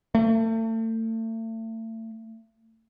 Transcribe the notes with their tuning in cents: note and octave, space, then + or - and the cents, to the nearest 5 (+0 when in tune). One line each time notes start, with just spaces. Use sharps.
A3 +35